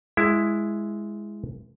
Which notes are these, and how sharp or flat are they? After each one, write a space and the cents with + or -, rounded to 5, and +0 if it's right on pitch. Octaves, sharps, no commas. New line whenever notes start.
G#3 +0 E4 +10